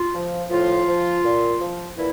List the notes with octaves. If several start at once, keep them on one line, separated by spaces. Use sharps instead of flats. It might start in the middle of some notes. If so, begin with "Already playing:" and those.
Already playing: F4
F3
A2 F3 F4
F3
A#2
F3
A#2 E3 E4